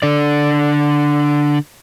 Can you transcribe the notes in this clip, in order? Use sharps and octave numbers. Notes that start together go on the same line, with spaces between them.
D3 D5